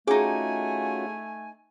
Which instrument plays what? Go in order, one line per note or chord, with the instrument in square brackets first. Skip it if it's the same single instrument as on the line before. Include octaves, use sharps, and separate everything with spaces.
[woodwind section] A3 G#5 [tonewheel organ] C#4 F4 F#4 [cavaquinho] D#4 D6 [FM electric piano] G#4